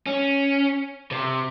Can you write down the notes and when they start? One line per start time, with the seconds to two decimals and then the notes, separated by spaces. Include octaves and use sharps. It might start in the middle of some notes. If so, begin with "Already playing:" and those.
0.07 C#4
1.11 C3